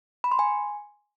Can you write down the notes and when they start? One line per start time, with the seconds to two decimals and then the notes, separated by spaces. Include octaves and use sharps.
0.24 B5
0.32 C6
0.39 G#5